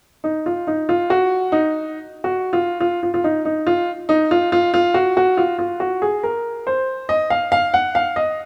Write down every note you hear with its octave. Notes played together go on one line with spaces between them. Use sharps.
D#4
F4
D#4
F4
F#4
D#4
F#4
F4
F4
F4
F4
D#4
D#4
F4
D#4
F4
F4
F4
F#4
F#4
F4
F4
F#4
G#4
A#4
C5
D#5
F5
F5
F#5
F5
D#5